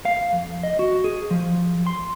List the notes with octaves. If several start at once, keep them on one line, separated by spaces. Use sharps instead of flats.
F5
F2
D#5
F#4
G#4
F3
C6